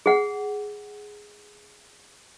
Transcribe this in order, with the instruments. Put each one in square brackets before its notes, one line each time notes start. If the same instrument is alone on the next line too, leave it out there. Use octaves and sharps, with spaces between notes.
[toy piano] G#4 F#5